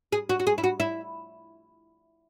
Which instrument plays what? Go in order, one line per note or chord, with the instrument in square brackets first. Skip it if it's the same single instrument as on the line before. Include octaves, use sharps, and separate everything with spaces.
[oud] G#4
F#4
F#4
G#4
E4
F#4
E4